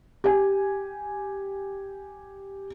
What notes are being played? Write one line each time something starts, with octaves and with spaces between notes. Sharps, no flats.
G4 G#5